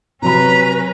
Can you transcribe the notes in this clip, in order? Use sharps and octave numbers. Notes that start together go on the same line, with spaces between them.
C3 F#3 C#4 B4 A#5 B5